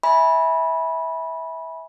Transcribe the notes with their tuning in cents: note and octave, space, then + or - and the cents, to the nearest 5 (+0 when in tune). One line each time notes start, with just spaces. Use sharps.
E5 -20 G#5 +0 B5 -15